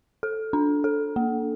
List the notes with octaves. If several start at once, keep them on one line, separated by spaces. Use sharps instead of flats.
A4
D4
A4
A#3